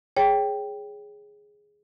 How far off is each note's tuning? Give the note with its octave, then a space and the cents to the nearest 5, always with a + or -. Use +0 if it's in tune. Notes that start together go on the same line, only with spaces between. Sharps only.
G#4 +0 C#5 +0 G5 +0